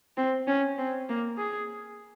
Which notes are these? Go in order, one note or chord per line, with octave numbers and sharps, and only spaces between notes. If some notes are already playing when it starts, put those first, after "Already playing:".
C4
C#4
C4
A#3
G#4